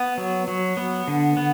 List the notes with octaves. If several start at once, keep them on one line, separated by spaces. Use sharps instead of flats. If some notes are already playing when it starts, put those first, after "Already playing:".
Already playing: B3
F#3
F#3
B3
D3
B3